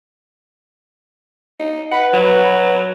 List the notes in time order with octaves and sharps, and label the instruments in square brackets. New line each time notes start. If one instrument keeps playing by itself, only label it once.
[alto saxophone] D#4
[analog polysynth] B4 [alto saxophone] F#5
[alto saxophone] F#3